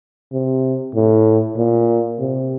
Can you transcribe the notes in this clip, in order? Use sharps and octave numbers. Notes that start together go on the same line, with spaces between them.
C3
A2
A#2
C3